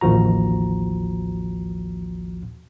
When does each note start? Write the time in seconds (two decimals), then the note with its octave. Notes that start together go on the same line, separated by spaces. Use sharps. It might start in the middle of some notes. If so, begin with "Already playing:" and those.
0.01 A1 D#2 F3 F#4 A#5